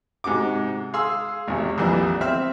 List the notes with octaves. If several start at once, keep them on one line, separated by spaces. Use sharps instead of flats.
G#2 C3 F#4 D6
G#4 F5 C6 E6
G#1 E2 C3
A#1 F2 E3 G3
C4 E5 F6